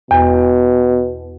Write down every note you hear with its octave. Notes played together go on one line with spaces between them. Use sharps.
E2 B2